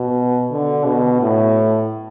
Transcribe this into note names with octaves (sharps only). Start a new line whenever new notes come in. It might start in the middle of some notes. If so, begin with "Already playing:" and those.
Already playing: B2
D3
B2
A2